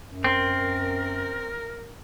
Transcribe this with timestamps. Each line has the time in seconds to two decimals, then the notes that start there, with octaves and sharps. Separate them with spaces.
0.07 F#2
0.24 C4 A#4